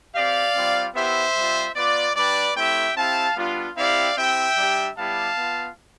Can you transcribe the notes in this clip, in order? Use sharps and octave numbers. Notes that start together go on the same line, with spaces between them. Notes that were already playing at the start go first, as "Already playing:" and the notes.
C4 G4 D5 F5
G3 C4 F4
B3 E4 G4 C5 E5
G3 C4 F4
B3 F4 B4 D5
G3 D4 G4 B4 D5
A3 C4 E4 G4 E5 G5
C4 E4 G4 F5 A5
G3 B3 D4 F4
C4 E4 G4 D5 F5
C4 E4 G4 E5 G5
G3 D4 G4
G3 B3 E4 G4 F5 A5
B3 F4